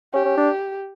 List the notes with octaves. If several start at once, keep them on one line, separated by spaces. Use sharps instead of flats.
C#4 G4
C#4
D4